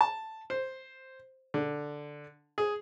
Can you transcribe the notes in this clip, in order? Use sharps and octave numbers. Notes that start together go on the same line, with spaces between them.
A5
C5
D3
G#4